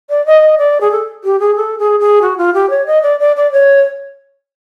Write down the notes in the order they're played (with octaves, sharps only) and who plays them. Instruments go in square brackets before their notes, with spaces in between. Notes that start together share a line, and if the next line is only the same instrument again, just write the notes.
[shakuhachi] D5
D#5
D5
G#4
A4
G4
G#4
A4
G#4
G#4
F#4
F4
G4
C#5
D#5
D5
D5
D5
C#5